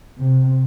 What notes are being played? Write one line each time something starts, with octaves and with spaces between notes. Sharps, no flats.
C3